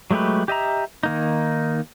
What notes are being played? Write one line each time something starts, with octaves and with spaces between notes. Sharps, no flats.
F#3 G#3 A3 G4 B4
G4 D#5 E5 A#5
D#3 A#3 D#4